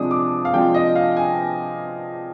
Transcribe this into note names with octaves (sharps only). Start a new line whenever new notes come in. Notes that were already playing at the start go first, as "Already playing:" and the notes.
Already playing: C3 F3 G#3 D4 D#6
D6
F5
C3 F3 G#3 D4 G5
D#5
F5
G#5